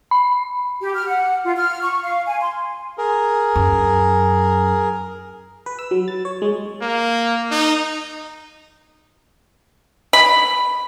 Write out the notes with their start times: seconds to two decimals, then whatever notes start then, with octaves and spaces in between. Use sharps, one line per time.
0.11 B5
0.81 G4
0.94 F6
1.08 F#5
1.45 F4
1.57 F6
1.82 C#6
2.04 F5
2.27 G#5
2.41 C6
2.98 G#4 A#4
3.56 F#2
5.66 B4
5.79 E6
5.91 F#3
6.08 A6
6.25 C#5
6.42 G#3
6.81 A#3
7.51 D#4
10.13 B5